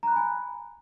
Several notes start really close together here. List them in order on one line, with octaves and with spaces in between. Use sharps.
A#5 F#6 B5 G#5